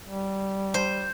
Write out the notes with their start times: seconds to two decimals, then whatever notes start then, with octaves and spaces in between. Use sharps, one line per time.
0.05 G3
0.74 C5